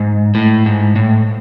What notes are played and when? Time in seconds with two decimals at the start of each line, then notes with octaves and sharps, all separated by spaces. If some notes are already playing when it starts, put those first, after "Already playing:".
Already playing: G#2
0.35 A2
0.66 G#2
0.96 A2